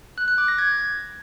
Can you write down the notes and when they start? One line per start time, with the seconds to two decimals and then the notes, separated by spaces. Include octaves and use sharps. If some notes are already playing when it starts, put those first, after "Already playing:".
0.18 F#6
0.28 F#6
0.38 D6
0.48 A#6
0.58 G#6